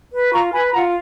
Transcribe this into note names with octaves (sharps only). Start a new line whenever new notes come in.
B4
F4 A#5 C#6
B4 G#5 B5
B5
F4 F#5 A#5